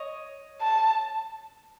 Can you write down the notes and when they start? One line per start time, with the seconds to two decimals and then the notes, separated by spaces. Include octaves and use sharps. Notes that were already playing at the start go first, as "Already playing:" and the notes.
Already playing: C#5 D#5
0.61 A5